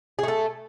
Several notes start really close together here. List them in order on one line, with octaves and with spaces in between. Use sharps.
G#4 A3 A4